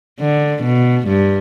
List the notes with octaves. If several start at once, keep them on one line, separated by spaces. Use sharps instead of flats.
D3
B2
G2